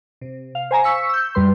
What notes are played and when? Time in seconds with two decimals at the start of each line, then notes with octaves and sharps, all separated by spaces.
0.21 C3
0.55 F5
0.71 C5 G#5 A#5
0.84 C#6 E6 B6 C#7
1.09 E6 G6
1.35 F#2 G3 B4 C6